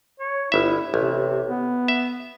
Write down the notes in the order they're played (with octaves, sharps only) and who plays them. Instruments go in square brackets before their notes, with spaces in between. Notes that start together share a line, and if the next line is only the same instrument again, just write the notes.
[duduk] C#5
[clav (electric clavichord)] G1 E5 [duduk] E4
[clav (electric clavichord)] A1 [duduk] C3
[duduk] B3
[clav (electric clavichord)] E5